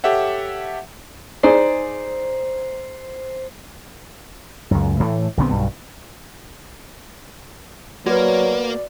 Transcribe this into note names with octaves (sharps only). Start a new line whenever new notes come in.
G4 A4 C#5 E5 F#5
D#4 G#4 C5 D5
C#2 F#2
A2 E3 A3
A#1 D3 B3 C4
B1 G2
F#3 A#3 F#4 B4 D5